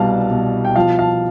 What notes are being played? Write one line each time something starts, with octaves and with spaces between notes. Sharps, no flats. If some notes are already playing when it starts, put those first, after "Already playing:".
Already playing: C2 B2 G3 F5 A5
B2
G5
F3 F5 A5
F5 A5